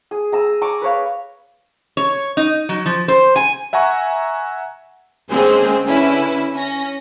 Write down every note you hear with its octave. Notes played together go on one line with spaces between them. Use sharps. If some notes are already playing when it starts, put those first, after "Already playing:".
G#4
G#4 A#5 E6
D5 A#5 C#6 D6
B4 C#5 F5
C#5
D#4
F#3
F3
C5
G#5
E5 F#5 G#5 A#5 C#6
D3 G#3 A#3 C4 C#4 G#4
D3 C#4 E4 B4
C#4 A#6